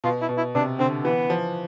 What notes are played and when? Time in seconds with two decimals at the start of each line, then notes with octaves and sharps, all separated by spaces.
0.04 B2 F4
0.22 E4
0.29 B2
0.37 E4
0.55 C3 D4
0.79 D3 C4
1.04 E3 B3
1.30 F3